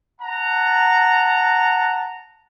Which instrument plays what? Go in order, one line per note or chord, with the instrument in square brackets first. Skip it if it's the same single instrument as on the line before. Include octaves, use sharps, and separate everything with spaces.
[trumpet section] F#5 A5 A#5